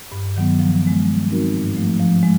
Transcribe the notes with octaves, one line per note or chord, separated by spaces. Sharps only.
G2
D#3 F#3 B3
F3
G#3 B3
G3
C4 D#4 F#4 A#4
G#2
F3 A3
F3
G#3